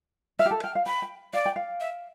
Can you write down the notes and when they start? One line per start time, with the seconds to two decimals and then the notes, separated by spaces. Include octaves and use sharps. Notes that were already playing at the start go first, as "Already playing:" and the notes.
0.39 E5 F6
0.46 G4
0.51 A4
0.63 G5 F6
0.75 F5
0.86 G5 B5
1.02 G5
1.33 D5 F5
1.46 G5
1.56 F5
1.80 E5